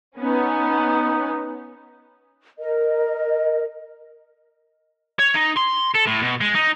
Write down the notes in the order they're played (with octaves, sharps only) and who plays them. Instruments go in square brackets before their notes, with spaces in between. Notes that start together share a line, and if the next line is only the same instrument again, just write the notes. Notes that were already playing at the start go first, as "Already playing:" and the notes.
[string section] B3 C#4 [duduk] D#4
[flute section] A#4 D#5
[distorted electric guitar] C#5
D#4
C6
A4
A2
B2
G#3
D#4